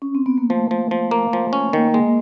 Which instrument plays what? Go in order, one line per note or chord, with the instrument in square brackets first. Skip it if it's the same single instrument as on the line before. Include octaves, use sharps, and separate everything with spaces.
[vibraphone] C#4
C4
B3
A#3
[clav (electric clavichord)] F3 [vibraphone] A3
[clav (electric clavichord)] F3
F3
A#3
F3
C#4
[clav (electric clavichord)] D#3 [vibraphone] A#3
[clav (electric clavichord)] G#3